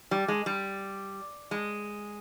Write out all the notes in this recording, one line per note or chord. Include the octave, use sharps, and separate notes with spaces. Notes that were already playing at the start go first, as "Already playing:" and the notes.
G3
G#3
G3
G#3